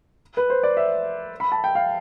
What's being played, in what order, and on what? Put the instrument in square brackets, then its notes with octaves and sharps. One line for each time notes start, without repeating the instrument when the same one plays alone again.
[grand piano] B4
C5
D5
E5
B5
A5
G5
F5